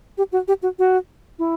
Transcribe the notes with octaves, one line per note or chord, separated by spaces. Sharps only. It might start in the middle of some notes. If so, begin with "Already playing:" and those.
G4
F#4
G4
F#4
F#4
E4